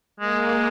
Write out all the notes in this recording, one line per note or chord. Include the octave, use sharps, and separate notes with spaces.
G#3 A#3